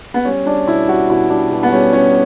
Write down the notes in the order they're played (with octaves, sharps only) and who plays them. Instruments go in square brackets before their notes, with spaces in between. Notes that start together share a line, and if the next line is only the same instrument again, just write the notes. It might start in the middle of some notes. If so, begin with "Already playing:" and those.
[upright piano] B3
G3 C#4
G3 D4
B2 E4
G3 F#4
B2 E4
G3 D4
B2
B3
G3 C#4
G3 C#4